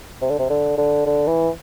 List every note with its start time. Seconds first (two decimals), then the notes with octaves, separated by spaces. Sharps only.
0.21 C3
0.30 D3
0.39 C3
0.50 D3
0.78 D3
1.06 D3
1.27 E3